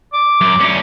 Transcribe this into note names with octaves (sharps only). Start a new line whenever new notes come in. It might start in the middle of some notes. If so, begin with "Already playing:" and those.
D6
F#2
D2 C#4